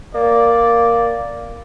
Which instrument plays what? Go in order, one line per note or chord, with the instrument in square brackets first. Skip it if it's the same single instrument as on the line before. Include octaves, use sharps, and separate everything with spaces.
[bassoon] A#3 [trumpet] D5